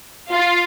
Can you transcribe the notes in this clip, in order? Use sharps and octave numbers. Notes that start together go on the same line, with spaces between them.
F4